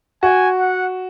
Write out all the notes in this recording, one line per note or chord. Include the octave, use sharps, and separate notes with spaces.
F#4 G#5
F#5